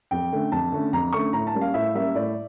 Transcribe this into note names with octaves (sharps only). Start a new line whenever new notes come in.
F2 G5
D3 A3 C#4
F2 A5
D3 A3 C#4
F2 A#5
D3 A3 C#4 C#6
A2 A#5
A5
G3 A#3 C#4
F5
A2 E5
G3 A#3 C#4 E5
A2 D5